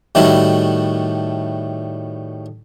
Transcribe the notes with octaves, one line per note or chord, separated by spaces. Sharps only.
A2 D#3 G3 A3 E4 F#4